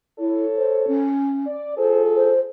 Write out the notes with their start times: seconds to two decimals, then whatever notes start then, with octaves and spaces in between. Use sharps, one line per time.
0.19 E4 A4 C#5
0.57 C5
0.87 C#4
1.46 D5
1.77 F4 G#4 A4 C5
2.15 C5